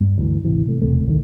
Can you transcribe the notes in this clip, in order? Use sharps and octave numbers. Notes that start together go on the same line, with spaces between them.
G2
D2 E3
G#1 C3 E3
C3 A3
E1 E2 C3 A3
D1 C2 C3 D#3